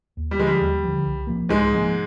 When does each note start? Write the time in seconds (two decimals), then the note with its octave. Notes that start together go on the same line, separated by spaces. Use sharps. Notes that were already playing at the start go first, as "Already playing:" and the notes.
0.17 D#2
0.31 G3
0.39 D3 F3 G#3
0.47 G3
0.61 D#2
0.84 D3 F3
1.05 C2
1.27 C3 F3 A#3
1.49 C2 G#2 G#3
1.72 C3 F3 A#3